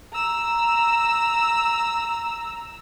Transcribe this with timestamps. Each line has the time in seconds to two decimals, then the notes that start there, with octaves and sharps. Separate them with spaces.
0.12 A#5 E6